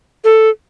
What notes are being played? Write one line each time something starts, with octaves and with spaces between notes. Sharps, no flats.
A4